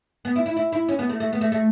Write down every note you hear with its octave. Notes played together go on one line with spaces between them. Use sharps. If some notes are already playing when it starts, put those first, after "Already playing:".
B3
E4
E4
E4
E4
C#4
B3
A3
A3
B3
A3
A3